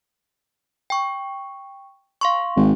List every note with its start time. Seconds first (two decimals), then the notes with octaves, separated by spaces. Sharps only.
0.90 G5 C#6
2.21 F5 C6 C#6
2.56 G#1